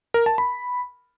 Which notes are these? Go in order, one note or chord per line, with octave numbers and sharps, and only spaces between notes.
A#4
A5
B5